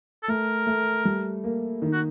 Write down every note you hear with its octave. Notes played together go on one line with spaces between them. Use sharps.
A4
A3 A#4
A3
G3
A#3
D#3
F#4